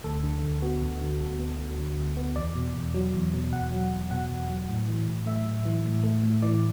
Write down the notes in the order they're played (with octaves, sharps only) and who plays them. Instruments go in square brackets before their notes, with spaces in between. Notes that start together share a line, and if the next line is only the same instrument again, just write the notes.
[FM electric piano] D2 A4
D3
D2
B3 F#4
D2
D3
D2 A4
B3
D2
D3
D2
B3
E2 D5
B2
E2
F#3
E2
B2
E2 F#5
F#3
E2
B2 F#5
E2
F#3
A2
E3
A2
A3 E5
A2
E3
A2
A3
A2
E3 D5